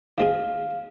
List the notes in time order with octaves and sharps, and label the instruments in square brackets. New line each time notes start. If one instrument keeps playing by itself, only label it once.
[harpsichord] D#3 G#3 C4 F4 G#4 [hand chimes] F5